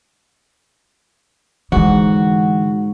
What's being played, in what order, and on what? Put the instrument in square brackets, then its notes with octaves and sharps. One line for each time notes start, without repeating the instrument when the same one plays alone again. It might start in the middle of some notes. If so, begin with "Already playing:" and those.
[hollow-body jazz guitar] G#2 [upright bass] D3 E3 [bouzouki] F#4